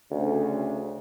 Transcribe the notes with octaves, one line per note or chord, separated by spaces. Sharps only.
D2 C#3